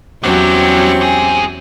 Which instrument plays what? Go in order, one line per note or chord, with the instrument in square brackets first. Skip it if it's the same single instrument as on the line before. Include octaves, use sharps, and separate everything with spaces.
[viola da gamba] E2 F#3 C#4 [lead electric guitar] G3 F#4 [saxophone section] C4 G4
[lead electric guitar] G#2 G#4